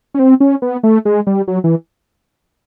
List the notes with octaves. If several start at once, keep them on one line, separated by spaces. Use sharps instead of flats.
C#4
C4
C#4
B3
A3
G#3
G3
F#3
E3